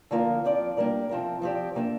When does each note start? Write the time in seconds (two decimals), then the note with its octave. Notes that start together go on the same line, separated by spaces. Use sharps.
0.11 D3 F3 A#3 F4 A#4
0.45 F3 C4 F4 D5
0.77 G3 A#3 D4 A#4 D5
1.09 C3 F3 C4 F4 A#4
1.42 F3 C4 G4 D5
1.75 C3 A#3 D4